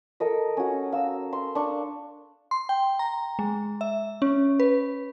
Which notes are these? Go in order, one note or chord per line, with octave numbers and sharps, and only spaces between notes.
A4 A#4 D#5
C#4 F#4
F5 E6
C6
D4 C#6
C6
G5
A#5
G#3
E5
C#4
B4